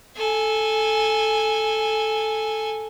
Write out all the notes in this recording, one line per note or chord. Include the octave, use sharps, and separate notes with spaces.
A4 G#5